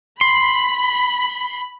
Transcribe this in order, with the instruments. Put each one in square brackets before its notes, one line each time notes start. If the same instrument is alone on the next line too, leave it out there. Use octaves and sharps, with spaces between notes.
[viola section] B5 [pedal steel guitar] C6